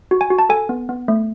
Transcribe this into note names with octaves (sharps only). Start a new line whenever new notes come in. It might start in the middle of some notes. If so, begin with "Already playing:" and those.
F#4
G#5
F#4
A5
A4 G#5
B3
B3
A3